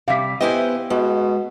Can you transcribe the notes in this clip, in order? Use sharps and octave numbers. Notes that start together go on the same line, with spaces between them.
C3 G3 F5 B6
B3 E4 G4 C5 D#5 G#5
B2 G#3